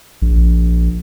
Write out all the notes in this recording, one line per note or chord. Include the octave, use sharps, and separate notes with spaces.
A#1